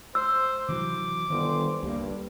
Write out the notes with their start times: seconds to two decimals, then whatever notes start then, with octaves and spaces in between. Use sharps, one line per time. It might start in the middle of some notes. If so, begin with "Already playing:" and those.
0.15 C5 E6
0.69 C3 E3 F#3 D6
1.30 G1 D#3 C5
1.83 C#2 G2 A#3